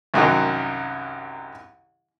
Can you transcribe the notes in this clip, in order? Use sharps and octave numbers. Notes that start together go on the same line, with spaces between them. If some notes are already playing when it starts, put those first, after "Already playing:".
C2 F#2 D#3 F#3